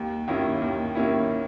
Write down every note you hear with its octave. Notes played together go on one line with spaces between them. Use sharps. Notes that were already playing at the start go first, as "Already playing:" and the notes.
Already playing: D#2
D#3 A#3 C#4 E4
D#2
D#3 A#3 C#4 E4